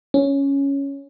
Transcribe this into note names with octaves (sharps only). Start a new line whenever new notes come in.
C#4